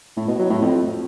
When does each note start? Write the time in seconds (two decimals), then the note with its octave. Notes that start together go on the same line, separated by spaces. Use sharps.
0.17 A2
0.28 B2
0.39 F#3
0.50 A2
0.61 F2